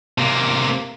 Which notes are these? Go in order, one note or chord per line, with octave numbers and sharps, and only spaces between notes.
C3 A#3